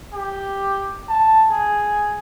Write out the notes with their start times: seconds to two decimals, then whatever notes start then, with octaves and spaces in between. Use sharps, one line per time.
0.14 G4
1.09 A5
1.50 G#4